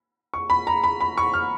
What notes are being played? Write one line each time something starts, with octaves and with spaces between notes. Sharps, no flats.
C#6
B5
A#5
B5
B5
C#6
F6